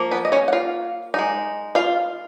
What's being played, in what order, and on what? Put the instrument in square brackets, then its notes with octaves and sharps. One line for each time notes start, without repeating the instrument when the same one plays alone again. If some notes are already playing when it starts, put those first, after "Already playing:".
Already playing: [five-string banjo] F3 A#3
B3 B4
D#5
C#4 C#5
F#5
F4 F5
G#3 D#4
F4 F5